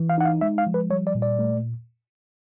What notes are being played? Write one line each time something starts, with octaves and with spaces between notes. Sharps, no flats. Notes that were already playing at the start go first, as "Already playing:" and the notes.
Already playing: E3
F5
D#4 F#5
F5
G#3 E5
F5
F3
B4
G3 C#5
D5
A#2
D5
A3